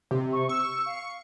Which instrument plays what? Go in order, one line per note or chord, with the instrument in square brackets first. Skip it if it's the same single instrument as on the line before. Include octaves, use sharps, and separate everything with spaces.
[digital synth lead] C3
[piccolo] C#6
[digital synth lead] C#6 [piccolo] E6
[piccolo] F5